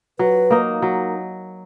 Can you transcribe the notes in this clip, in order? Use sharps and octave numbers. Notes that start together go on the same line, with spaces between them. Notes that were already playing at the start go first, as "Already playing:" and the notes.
F#3 B4
A#3 D#4
F#3